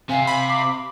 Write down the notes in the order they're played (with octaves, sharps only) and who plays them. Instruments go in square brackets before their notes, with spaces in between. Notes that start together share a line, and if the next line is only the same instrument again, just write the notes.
[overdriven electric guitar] C3 [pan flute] F5 [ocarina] G#5
[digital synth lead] B5
[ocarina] D6